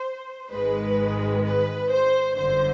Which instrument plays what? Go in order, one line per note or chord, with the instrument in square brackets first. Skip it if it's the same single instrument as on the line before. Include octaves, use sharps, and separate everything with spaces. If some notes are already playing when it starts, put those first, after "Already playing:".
Already playing: [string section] C5
G#1 G#2 D#3 G#3 B4
B4
C5
G1 F#2 D3 C5